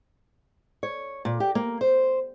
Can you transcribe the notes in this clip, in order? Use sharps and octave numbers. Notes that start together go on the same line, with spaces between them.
C#5
A#2
G4
A#3
C5